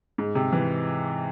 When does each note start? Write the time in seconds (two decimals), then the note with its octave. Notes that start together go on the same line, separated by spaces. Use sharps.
0.18 G#2
0.35 C3
0.53 E3